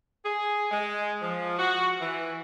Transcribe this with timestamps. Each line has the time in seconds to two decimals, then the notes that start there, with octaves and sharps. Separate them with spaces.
0.25 G#4
0.71 G#3
1.21 F3
1.59 F#4
2.01 E3